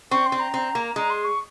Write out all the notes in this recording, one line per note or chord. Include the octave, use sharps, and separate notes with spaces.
C4 C#6
C6
C4
A#5
C4
A#3
G#3 A#5
C6
C#6